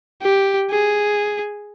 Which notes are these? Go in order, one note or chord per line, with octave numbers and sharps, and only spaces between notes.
G4
G#4